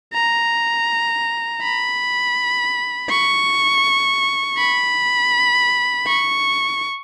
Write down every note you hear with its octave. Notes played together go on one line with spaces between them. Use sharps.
A#5
B5
C#6
B5
C#6